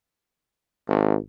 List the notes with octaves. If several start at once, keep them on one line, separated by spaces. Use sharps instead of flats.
G#1